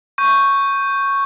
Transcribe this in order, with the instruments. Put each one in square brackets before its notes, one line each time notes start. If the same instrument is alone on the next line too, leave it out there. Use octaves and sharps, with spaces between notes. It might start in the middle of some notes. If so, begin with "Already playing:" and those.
[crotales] C#6 G6